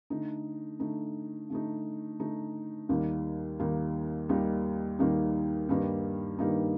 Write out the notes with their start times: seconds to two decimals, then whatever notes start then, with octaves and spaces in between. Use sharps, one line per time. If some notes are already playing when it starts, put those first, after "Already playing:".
0.10 D3 A3 D#4
0.80 D3 A3 D#4
1.50 D3 A3 D#4
2.20 D3 A3 D#4
2.89 D#2 D#3 G3 A#3 D#4
3.59 D#2 D#3 G3 A#3 D#4
4.29 D#2 D#3 G3 A#3 D#4
4.99 D#2 D#3 G3 A#3 D#4
5.69 G2 D#3 G3 A#3 D#4
6.39 G2 D#3 G3 A#3 D#4